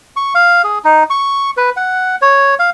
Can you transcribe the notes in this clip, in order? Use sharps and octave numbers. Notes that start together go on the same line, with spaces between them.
C#6
F5
G#4
D#4
C#6
B4
F#5
C#5
F5